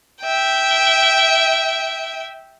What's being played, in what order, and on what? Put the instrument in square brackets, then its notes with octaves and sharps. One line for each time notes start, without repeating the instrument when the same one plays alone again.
[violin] E5 G5